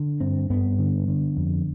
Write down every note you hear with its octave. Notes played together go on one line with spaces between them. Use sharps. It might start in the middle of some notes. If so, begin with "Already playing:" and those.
Already playing: D3
G2 C4
G2 B3
D3
D3
F2